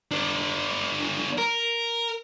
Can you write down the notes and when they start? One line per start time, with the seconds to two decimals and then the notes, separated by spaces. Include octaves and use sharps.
0.11 B3 D4
1.38 A#4